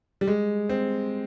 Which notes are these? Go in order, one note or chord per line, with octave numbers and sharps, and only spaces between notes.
G3
G#3
C4